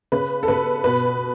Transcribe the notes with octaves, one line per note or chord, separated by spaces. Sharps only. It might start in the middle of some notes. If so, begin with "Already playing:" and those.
C#3 B4
A4
C#3 B4
B2 B4